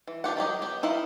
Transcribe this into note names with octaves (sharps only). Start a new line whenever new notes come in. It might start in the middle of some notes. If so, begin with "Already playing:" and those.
E3
D4 F4 G4 F#5
D#3 F#3 G4 D#5
B3 G4
D#4 E4 B4 D#5 F5